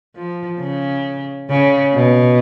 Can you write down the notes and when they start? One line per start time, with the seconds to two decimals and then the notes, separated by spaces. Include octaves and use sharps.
0.16 F3
0.60 C#3
1.50 C#3
1.95 B2